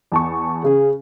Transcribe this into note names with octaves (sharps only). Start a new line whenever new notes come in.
E2 A5 C#6
C#3 G#4